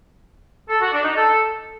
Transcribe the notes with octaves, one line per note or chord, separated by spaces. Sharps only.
A4
F#4
D4
D#4
A4